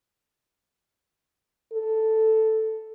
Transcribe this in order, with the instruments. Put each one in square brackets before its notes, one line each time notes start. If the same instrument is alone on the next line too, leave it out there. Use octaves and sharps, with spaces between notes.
[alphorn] A4